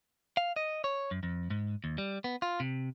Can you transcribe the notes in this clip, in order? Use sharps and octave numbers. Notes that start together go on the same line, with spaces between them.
F5
D#5
C#5
F#2
F2
G#2
D#2
G3
B3
F4
C3